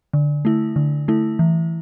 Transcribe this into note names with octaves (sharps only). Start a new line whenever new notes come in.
D3
A3 E4
D3
A3 E4
E3